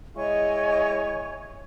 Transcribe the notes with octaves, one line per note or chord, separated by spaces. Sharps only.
G#3 E4 C#5 D#5 G#5 C#6